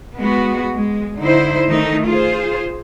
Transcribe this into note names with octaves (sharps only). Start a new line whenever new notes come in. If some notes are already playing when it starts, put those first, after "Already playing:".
G#3 B3 F#4
G#3
D3 D#4 E4 C5
D#3 A3 D#4
F4 G#4 C5